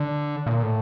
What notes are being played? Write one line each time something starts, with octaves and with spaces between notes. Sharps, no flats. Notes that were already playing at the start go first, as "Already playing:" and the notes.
Already playing: D3
A#2
A2